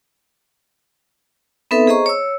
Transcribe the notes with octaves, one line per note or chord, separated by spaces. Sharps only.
B3 C4 D#4 A4 B4 E5
G#4 C5 D#5 A#5 C#6
C#5 E6